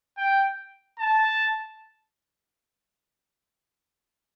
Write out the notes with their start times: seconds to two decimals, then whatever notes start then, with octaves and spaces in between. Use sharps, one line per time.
0.17 G5
0.99 A5